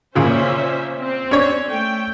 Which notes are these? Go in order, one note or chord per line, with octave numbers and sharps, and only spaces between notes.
A#2 C#3 F3 C#4 C5 E5
C4
C#4 D4 C#5
A3 G5